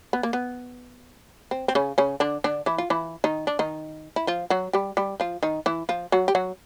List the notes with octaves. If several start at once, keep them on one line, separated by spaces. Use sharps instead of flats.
B3
A#3
B3
C4
C4
C#3 C#4
C#3 C#4
D3 D4
D3 D4
E3 E4
F4
E3 E4
D#3 D#4
D4
D#3 D#4
E4
F3 F4
F#3 F#4
G3 G4
G3 G4
F3 F4
D#3 D#4
E3 E4
F3 F4
F#3 F#4
G4
F#3 F#4